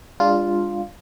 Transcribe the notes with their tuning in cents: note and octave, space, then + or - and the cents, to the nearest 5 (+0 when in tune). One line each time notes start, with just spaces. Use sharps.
G#3 -40 D4 +0 F4 +0